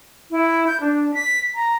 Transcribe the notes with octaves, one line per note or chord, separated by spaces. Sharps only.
E4
G6
D4
B6
A#5